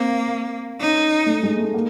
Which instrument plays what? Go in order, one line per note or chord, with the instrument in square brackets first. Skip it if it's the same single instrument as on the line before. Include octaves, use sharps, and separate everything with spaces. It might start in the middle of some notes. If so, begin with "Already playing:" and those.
Already playing: [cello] A#3 [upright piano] C4
[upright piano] C#4 [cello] D#4
[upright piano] A3
G#3
A3
A#3